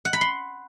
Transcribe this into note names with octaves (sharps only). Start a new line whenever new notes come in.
F#5
B5
C6